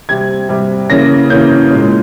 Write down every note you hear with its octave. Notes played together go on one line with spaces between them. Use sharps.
C3 G3 C4 G#6
C3 G3 C4
C#3 E3 A#3 C#4 A#6
C#3 E3 A#3 C#4 G6
A#2 G#3 C#4